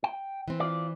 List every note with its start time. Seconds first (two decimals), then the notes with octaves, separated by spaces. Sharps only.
0.04 G5
0.48 E3 C4
0.60 F4 D5